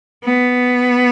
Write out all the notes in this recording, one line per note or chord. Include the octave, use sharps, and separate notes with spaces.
B3